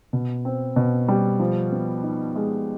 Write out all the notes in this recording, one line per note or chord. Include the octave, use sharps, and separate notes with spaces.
B2
C4
B2
G3
F3
B3
D#4
G#3